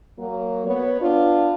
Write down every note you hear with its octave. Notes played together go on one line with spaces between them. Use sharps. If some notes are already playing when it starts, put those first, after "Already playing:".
F#3 A#3
B3 C#5
B3 D4 F4